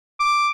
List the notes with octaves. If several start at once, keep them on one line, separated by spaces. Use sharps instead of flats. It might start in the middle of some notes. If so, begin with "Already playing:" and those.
D6